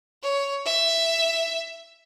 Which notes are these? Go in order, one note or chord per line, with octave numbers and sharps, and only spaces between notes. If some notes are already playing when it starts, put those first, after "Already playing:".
C#5
E5